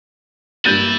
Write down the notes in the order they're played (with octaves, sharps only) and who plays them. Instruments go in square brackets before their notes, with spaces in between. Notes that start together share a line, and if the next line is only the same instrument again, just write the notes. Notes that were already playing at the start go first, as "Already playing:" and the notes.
[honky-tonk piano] G2 A#3 [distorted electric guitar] E3 E4 [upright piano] G6 A6 D#7